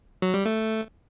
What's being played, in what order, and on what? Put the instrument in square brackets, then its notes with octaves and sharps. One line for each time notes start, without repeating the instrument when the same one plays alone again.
[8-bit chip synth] F#3
G3
A3